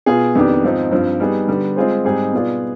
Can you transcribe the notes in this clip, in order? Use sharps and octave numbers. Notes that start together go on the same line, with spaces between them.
B2 B3 F4 G#4
F2 D#3 B3 D4 G4
G#2 F3 C4 D#4
G2 F3 C4
G3 B3 D#4 G#4
D3 G3 B3
G#3 C4 F4 G#4 C5
G#2 G3 C4 D#4 G#4
B2 B3 F4 G#4 D5